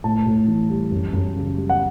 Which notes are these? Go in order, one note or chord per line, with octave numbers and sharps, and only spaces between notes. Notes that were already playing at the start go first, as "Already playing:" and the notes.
A2 A5
A2
E3
G3
F#2
F#2
C#3
G3
F#5